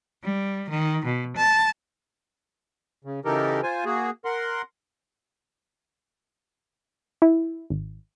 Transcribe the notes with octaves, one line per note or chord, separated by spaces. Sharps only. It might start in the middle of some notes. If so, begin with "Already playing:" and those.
G3
D#3
B2
A5
C#3
C#3 E3 D#4 G4 A4 A#4
F4 C5 G#5
A#3 F#4 G#4
A#4 F#5 C6
E4
G#1